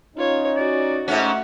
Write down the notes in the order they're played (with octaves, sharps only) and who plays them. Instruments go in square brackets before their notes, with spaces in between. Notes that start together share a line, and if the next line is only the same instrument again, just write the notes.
[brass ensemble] C#4 D#4 [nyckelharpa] F4 C#5
[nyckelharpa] F#4 [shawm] D5
[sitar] G#2 C#4 [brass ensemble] A3 [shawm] F#5